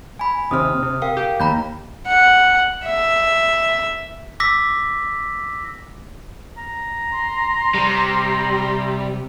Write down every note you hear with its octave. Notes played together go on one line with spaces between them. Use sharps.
G#5 B5
D#2 C3 D#6 F6
C3
A#4 F5 G5
G4
D#2 A#5 B5 G6
F#5
E5
D6 E6 A#6 B6
A#5
C6
C3 G3